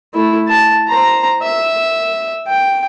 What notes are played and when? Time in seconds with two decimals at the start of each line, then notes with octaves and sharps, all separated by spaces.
0.14 A3 E4
0.48 A5
0.88 C5 A#5
1.42 E5
2.47 G5